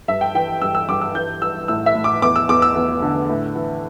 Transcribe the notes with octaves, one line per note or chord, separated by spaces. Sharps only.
G2 E5
G5
E3 G5
G2 E6
E6
G2 D6
E6
E3 G6
E3 E6
A2 E6
E5
A2
D6
E2 D6
E6
E2 D6
E6
E2
D3
A2
E3